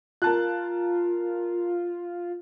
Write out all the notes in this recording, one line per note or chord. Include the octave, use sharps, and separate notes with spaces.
F4 A#4 A5 F#6